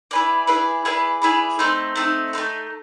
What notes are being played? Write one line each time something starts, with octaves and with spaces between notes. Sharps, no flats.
E4 G#4 B4 D5
E4 G#4 B4 D5
E4 G#4 B4 D5
E4 G#4 B4 D5
A3 C4 D#4
A3 C4 D#4
A3 C4 D#4